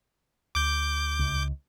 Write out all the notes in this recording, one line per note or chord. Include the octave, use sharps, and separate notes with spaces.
D2 D6 G6
C#2